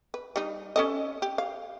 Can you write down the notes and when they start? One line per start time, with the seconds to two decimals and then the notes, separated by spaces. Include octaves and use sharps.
0.14 B4
0.36 G3 D#4
0.76 C#4 A4 D#5
1.22 G4
1.38 F5